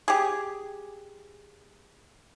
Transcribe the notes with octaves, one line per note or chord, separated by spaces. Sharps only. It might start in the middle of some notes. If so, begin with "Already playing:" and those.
G4 G#4